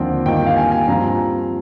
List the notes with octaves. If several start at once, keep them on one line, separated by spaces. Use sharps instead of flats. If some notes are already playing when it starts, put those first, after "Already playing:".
Already playing: D#2 D3 F3 C4 G5
G2 D#3 A#3 F4 G5
G5
F5
G#5
G#5
G2 F3 C4 F4 A#5